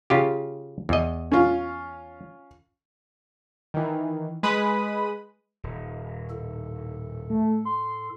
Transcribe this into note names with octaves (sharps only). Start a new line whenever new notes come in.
C#3 F4 G4
E2 D#5
C#4 F4
D#3 E3
G#3 B4 B5 D#6 D#7
D#1
A2 A4
A3
C6